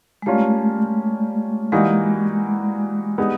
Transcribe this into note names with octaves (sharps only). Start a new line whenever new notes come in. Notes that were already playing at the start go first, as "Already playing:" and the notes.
G#3
G3 A3 A#3 C#4 F4
E3 G3 G#3 A#3 D#4 F#4
G3 B3 D#4 G#4